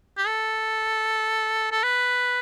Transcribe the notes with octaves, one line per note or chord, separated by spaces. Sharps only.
G4
A4
A4
B4